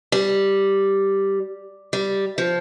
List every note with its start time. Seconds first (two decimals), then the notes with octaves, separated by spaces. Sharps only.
0.12 G3
1.93 G3
2.38 F3